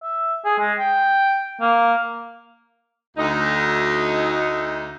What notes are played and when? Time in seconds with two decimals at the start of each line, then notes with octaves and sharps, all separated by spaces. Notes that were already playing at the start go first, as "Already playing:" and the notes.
0.02 E5
0.45 G#4
0.59 G#3
0.79 G5
1.61 A#3
3.17 D2 D#4